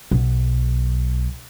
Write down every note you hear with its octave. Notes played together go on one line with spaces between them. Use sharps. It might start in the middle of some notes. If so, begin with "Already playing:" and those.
B1